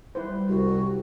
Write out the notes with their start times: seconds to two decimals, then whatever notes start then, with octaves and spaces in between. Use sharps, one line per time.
0.15 G3 E4 B4 C5
0.49 C2 F#4